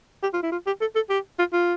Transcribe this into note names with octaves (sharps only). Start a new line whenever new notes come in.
G4
F4
E4
F4
G4
A4
A4
G4
F4
F4